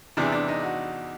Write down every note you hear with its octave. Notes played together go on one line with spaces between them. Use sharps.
E2 C3 E3 D4
D4
D#4
F#4